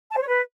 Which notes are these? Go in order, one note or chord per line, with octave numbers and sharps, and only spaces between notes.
A5
C5
C#5
B4